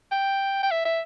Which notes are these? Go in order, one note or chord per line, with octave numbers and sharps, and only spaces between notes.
G5
G5
E5
E5